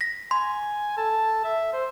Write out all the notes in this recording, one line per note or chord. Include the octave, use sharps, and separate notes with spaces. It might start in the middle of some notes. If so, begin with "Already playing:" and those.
A#6 B6
G#5 C6
A4
E5
C5